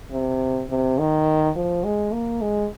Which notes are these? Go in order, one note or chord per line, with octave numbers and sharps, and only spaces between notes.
C3
C3
D#3
F3
G#3
A#3
G#3